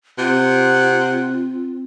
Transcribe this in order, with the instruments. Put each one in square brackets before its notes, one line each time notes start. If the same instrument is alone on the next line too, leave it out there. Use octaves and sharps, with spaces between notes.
[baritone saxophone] C3 [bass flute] C4 [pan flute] F4 [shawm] F#5